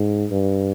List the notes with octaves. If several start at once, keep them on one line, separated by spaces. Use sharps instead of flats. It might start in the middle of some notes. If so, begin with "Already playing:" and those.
Already playing: G#2
G2